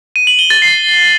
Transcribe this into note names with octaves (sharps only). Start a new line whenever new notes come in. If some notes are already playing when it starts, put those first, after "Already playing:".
D#7
F#7
G7
A6
C7